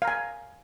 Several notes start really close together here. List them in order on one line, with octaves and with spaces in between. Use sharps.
F5 A#5 G#5